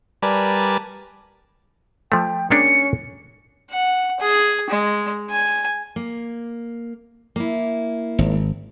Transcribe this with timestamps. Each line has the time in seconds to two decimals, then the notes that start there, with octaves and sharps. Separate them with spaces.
0.23 G3 A#4 B4 D5 G#5 A5
2.12 F3 A3 G5
2.51 G#3 A#3 C#4 D4 C#7
3.70 F#5
4.20 G#4
4.70 G#3
5.30 G#5
5.96 A#3
7.36 A#3 E4
8.19 G#1